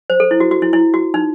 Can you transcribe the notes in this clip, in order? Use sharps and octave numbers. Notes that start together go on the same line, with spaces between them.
C5
A4
E4
F#4
F#4
E4
E4
F#4
D#4